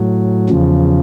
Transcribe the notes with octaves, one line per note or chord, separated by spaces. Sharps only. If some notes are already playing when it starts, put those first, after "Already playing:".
Already playing: A2 F#3
E2 C#3 F3